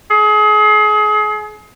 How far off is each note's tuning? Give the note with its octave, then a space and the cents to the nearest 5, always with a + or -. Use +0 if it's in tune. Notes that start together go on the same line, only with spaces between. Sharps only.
G#4 +35